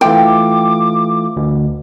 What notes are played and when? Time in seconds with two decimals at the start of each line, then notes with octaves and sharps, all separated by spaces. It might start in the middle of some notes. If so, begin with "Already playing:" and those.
0.01 E3 A3 F4 G5 D6
1.37 D2